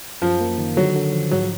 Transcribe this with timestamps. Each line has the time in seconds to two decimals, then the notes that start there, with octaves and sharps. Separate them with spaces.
0.22 F#2 F3
0.40 A#3
0.58 D#3
0.76 D3 F#3
0.95 D3
1.13 F3
1.31 G#2 F#3